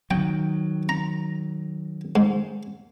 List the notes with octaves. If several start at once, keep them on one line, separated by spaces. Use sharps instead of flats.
D#3 F#3 G5
A#5
G#2